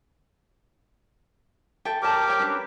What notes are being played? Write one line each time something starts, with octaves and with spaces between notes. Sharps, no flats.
A4 E5 G5
G4 A#4 C#5 A5 D6
C5 C#5 G5
C#4 D4 B4